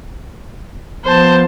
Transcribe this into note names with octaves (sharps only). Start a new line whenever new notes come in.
F3 B3 C5 A5